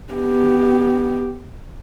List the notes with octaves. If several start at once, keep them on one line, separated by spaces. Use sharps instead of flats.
B3 G4